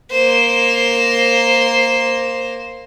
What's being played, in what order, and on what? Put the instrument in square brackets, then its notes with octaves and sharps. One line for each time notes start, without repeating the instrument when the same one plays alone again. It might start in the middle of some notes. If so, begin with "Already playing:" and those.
[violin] A#3 C5